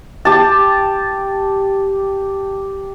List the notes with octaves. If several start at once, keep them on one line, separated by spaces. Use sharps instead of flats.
G4 A5